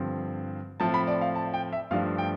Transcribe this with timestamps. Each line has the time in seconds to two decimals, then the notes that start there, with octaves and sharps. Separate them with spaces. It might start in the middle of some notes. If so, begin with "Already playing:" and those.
Already playing: G2 D3 F3 C4
0.80 A2 F3 C4 A5
0.94 B5
1.07 D5
1.21 F5
1.35 A5
1.54 G5
1.73 E5
1.91 G2 F3 A3 D4 F5
2.18 G5